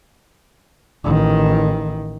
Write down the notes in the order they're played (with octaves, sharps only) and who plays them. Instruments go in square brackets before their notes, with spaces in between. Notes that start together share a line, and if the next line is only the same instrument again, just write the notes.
[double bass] A1 D#3